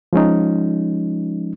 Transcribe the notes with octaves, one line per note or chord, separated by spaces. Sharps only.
F3 G#3 C#4 D#4